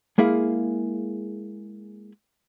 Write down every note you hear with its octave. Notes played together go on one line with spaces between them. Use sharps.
G#3 A#3 E4 G#4 F5